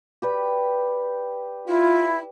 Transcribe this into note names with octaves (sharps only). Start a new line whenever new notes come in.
G4 B4 D5
E4 F4